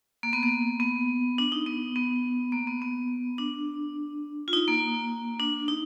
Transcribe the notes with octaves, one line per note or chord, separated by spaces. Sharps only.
A#3
B3
A#3
B3
D4
D#4
B3
B3
A#3
B3
B3
D4
F4
D#4
A#3
D4
D#4